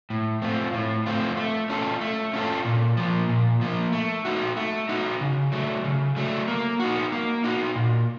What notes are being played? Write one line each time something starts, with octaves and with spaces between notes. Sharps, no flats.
A2
A3 C4 F4
A2
A3 C4 F4
A3
C#4 F4 A4
A3
C#4 F4 A4
A#2
F3 A#3
A#2
F3 A#3
A3
D#4 F#4
A3
D#4 F#4
C#3
F#3 A3
C#3
F#3 A3
A#3
D#4 F#4
A#3
D#4 F#4
A#2